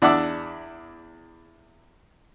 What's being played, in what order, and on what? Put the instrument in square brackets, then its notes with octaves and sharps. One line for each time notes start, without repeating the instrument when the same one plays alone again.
[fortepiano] E2 D4 E5 F#5 D6 E6